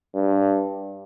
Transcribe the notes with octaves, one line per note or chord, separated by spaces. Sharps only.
G2